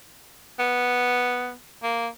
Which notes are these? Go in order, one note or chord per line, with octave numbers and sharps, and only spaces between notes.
B3
A#3